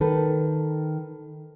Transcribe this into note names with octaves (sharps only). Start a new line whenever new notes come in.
D#3 A4 B4